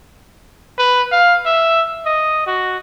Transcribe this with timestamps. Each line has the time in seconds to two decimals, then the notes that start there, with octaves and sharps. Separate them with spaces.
0.79 B4
1.11 F5
1.46 E5
2.06 D#5
2.47 F#4